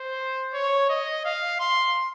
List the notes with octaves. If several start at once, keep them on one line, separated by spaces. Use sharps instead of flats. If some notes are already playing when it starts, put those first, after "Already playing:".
Already playing: C5
C#5
D#5
F5
C6